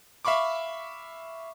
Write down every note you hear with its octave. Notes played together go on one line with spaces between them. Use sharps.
E5 F5 B5 C#6 D6